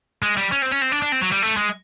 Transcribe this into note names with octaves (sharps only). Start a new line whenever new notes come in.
G#3
G3
C#4
C4
C#4
C4
D4
D4
C4
F#3
G3
A3
G#3